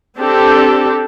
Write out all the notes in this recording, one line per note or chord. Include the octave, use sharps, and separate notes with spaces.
C4 D4 G4 A4